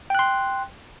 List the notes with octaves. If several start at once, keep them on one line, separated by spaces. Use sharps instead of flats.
G5 C6 F#6